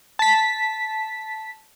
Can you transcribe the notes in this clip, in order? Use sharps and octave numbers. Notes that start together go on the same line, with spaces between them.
A5 B6